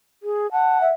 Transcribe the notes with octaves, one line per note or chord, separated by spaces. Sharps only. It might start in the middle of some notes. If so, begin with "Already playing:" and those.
G#4
F#5 A5
E5